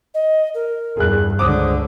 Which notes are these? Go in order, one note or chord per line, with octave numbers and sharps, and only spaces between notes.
D#5
A#4
E2 G2 G#4 F#6
C#2 D3 C5 D6 D#6